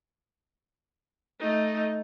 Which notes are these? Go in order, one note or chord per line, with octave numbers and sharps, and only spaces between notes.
A3 D#4